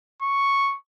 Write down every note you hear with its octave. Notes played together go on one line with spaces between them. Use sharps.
C#6